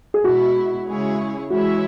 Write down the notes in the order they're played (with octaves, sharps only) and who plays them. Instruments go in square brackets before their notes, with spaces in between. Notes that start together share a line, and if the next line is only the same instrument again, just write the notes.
[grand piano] G#4
[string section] B2 G#3 E4 [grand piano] F#4
[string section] C#3 G#3 E4 G#4 C#5
[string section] E3 G#3 E4 C#5 E5 [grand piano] F#4